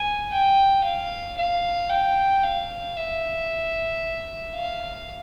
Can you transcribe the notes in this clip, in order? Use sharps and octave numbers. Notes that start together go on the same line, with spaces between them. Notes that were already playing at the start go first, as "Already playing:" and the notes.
Already playing: G#5
G5
F5
F5
G5
F5
E5
F5